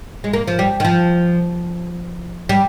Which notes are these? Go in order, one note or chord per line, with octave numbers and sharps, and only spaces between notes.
G#3
A#3
F3
G3
D#3
F3
G3